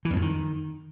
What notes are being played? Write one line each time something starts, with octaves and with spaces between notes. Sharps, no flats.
E3
E2
F2
D#3